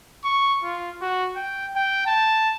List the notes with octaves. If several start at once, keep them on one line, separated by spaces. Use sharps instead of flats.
C#6
F4
F#4
G5
G5
A5